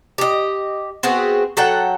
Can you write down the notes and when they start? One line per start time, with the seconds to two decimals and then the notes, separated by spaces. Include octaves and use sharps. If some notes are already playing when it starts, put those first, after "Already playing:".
0.18 G4 D#5
1.03 B3 C4 F#4 G#4
1.57 F#3 A4 F#5 G5